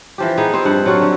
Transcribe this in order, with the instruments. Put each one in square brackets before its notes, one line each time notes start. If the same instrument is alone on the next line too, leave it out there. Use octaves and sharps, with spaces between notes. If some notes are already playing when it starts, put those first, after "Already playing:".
[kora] E3 F3 G4
B3 D#4 G#4
C4 G4 G#4 C5
G2 F3 F#5
F#3 F4 F#4 A4
D3